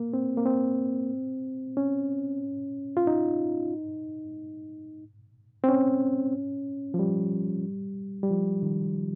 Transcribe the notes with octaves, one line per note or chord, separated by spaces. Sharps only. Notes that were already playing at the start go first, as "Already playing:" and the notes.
Already playing: A#3
C4
A#3
C4
C#4
F4
D#4
C4
C#4
F3
G3
G3
F3
D#3